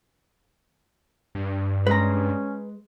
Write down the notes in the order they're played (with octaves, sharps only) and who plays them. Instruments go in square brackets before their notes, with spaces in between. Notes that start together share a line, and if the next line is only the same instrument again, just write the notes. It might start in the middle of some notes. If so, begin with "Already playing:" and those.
[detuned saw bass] G2
[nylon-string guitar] G#3 [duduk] C#4 [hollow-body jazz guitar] B4 A#5